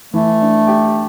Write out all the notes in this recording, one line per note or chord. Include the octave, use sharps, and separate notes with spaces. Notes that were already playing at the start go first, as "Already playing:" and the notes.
E3 A3
D4
G4